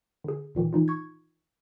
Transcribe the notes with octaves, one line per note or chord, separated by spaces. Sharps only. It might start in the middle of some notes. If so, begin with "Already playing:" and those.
D3 G#4
G#1 A#2 D#3 E3
E3 D#4 F4
C#6 G#6